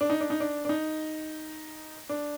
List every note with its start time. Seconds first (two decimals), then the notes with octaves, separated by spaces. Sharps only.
0.01 D4
0.10 D#4
0.20 D4
0.30 D#4
0.40 D4
0.65 D4
0.69 D#4
2.09 D4